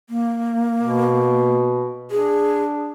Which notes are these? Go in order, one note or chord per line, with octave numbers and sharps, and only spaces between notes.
A#3
B2
D4 G#4